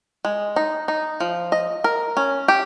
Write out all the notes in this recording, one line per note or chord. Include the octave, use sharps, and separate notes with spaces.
G#3
D#4
D#4
F3
D#5
A#4
C#4
G4